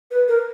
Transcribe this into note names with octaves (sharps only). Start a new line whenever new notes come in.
B4
A#4